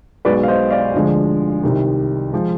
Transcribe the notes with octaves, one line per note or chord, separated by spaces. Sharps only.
B1 B2 G#3 B4 D5
F5
C5 D#5
D5 F5
D2 D3 F3 G#3
C2 C3 D#3
F3 G#3